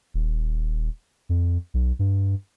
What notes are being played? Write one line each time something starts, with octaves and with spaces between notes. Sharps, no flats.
D#1
F2
B1
G2